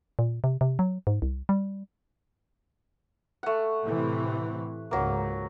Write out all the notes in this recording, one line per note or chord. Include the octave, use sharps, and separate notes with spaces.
A#2
C3
C3
F#3
G#2
C2
G3
A3 F#5
A2 C3 E3
C#2 G#2 F#3 A#3